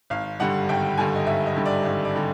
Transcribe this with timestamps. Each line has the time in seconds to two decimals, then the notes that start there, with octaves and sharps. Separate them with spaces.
0.10 G#1 F5
0.40 G2 D3 G3 F#5
0.69 G#1 G5
0.98 G2 D3 G3 G#5
1.16 D#5
1.26 G#1 E5
1.46 D#5
1.56 G2 D3 G3
1.66 D5
1.85 G#1
2.05 D5
2.16 D3 G3